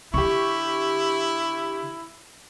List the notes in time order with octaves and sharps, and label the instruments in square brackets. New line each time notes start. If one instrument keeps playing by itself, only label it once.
[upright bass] D3 [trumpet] E4 [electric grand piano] G4 C#6